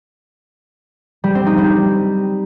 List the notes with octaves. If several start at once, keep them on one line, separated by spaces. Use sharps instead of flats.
G3
C4
D#4
G3